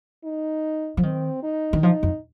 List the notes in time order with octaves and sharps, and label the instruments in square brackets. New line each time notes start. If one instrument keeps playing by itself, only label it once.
[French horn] D#4
[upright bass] F3
[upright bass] D#3 [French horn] C4
[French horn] D#4
[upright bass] D#3
[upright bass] F3 [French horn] D#4
[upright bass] F2